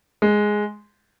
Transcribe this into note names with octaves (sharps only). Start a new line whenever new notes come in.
G#3